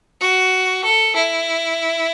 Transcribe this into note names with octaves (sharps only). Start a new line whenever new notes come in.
F#4
A4
E4